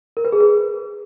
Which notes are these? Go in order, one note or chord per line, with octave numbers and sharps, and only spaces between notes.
A#4
B4
G#4
B4